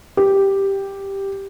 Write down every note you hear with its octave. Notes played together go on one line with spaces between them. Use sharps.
G4